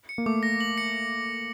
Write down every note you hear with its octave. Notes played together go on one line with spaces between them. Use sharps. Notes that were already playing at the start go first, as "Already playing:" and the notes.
C#7
A#3
A3 D6
A#6
F#7
C#7